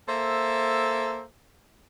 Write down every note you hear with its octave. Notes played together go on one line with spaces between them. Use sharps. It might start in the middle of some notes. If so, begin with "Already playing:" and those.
A#3 A4 C5 E5